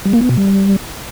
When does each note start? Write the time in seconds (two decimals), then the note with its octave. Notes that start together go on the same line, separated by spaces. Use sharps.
0.05 G3
0.13 A#3
0.21 B3
0.29 B2
0.37 G3